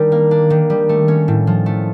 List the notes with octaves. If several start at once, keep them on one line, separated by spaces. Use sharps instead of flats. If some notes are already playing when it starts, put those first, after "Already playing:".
Already playing: D#3 G3 D4
A#3
D4
D#3
G3
A3
C#4
A2
F3
A3